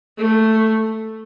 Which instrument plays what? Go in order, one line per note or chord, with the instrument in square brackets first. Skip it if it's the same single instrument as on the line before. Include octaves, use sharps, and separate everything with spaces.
[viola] A3